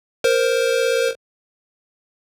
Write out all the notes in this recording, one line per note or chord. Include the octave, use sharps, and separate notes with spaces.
A#4 C5